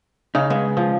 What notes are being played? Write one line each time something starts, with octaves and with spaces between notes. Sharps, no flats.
C#3 D#4
G#3 B3
F3